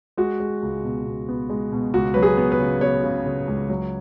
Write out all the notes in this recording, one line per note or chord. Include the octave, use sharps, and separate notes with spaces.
G#3 F#4
G#3
C#2
B2
B2
B3
G#3
B2
C#2 F#4
F#3 B4
G#4
B3
B4
C#3
B3 C#5
C#3
C#3
C#2
F#3